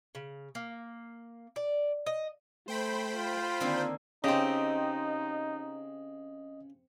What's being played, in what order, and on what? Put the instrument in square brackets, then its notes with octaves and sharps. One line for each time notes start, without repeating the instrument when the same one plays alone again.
[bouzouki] C#3
A#3
D5
D#5
[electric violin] A3 [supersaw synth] C5 G5 B5
[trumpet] F4
[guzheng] D3 D#3 A#3 [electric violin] C4
[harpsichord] C#3 [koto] C4 G4 [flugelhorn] D#4 [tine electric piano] D#5